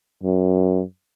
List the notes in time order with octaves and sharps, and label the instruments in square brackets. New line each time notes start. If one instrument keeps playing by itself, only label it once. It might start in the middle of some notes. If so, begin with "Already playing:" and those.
[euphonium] F#2